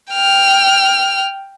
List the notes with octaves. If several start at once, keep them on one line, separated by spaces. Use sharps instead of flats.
G5 F6